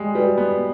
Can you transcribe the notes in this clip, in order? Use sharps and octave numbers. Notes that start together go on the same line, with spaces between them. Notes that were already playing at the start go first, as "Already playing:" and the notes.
Already playing: G3 G#3
G3 F#4 B4 D5
B3